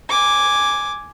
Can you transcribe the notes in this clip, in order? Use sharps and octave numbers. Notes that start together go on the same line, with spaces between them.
G#5 D6